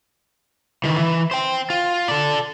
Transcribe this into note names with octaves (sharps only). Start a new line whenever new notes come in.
D#3 E3
E3
C5 G5
F4
A4 D5